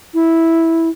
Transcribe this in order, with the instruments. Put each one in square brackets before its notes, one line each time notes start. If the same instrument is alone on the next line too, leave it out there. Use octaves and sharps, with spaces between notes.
[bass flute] E4